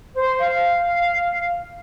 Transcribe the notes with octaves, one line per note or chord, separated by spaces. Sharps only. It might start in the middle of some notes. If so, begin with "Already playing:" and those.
C5
F5